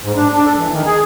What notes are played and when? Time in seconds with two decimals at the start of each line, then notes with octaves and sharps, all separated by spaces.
0.04 G#2
0.16 D4
0.33 D4
0.46 A4
0.58 E3
0.72 D#3
0.85 G#4